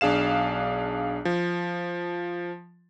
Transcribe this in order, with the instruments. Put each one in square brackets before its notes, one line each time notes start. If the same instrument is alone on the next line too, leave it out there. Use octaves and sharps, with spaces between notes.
[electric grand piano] B1 D4 G#4 F5 E7
F3